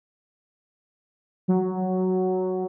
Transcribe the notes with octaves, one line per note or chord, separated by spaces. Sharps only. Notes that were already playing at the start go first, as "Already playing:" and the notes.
F#3